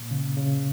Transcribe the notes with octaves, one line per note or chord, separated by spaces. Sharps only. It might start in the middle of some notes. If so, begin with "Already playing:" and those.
Already playing: A#2
C#3
C#3